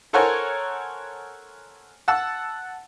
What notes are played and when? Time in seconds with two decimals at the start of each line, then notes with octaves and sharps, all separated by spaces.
0.13 A4 A#4 C5 C#5 F#5 G#5
2.08 F#5 A5 E6